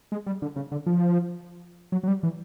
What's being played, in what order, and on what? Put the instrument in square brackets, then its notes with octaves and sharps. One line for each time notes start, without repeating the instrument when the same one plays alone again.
[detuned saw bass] G#3
G3
D3
C#3
D3
F3
F#3
F#3
G3
E3